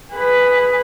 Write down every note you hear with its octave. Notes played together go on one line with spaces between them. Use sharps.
G#4 B4